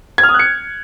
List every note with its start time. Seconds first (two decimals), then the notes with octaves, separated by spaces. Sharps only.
0.18 G#6
0.23 F6
0.29 D#6
0.34 F#6
0.39 C#7